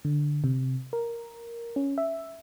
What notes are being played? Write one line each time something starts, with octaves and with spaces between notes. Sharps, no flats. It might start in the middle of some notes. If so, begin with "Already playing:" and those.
D3
C3
A#4
C#4
E5